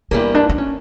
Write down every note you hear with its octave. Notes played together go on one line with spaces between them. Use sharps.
G2 E3 G3 A#3 B3
D4
D4
C#4